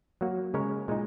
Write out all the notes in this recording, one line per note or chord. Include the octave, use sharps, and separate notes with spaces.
F#3 A#3 F#4
C#3 G#3 C#4 A#4 C#5
A#2 G#3 D#4